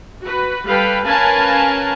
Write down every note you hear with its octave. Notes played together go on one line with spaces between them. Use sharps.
F#4 B4
G3 A4 B4 F5 G5
C#4 A#4 B4 F5 G#5 A5